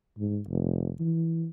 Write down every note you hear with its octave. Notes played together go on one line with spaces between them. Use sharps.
G#2
F1
E3